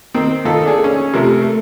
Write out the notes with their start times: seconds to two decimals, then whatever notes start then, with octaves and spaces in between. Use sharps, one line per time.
0.15 D#3 C4
0.45 D#3 D#4 F4 A4
0.65 D4 G#4 A4
0.84 C#4
1.13 C3 F3 A3 A#4
1.42 A3